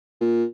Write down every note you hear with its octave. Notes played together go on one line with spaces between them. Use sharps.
A#2